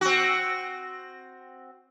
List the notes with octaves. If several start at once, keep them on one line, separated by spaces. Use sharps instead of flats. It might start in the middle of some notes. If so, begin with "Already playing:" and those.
C4 F#4